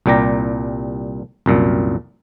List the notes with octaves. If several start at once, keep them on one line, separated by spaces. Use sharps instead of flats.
C2 A#2 G3 G4 A#5
C2 F#2 A#2